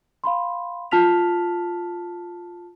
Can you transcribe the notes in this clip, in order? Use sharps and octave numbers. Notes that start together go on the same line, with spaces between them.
F5 B5 C6
F4 A5 F6 B6 F7